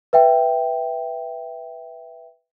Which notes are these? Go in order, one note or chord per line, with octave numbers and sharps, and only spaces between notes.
B4 E5 G5